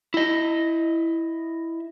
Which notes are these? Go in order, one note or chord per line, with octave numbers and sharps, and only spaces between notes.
E4 D#5